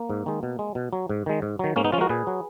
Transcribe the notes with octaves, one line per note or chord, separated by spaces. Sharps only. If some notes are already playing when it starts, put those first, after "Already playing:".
Already playing: A#3
G#2
D#3 G#3
B2
G#3
B2
F#3
G#2
D#3 G#3
G#2
D#3 F#3
G#2 A#3 C#4
B3 D#4
F3 C#4 F4
G#3 F#4 A#4
A#2 G#4 B4
F#3